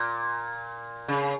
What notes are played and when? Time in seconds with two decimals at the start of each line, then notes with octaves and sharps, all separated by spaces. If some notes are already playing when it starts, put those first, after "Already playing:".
Already playing: A#2
1.08 C#3